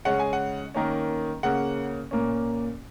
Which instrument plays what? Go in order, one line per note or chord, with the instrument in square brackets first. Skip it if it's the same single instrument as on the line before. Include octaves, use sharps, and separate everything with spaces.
[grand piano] C#3 G#3 C#4 F#5
G#5
F#5
D#3 A#3 C#4
C#3 A#3 C#4 F#5
A#2 A#3 C#4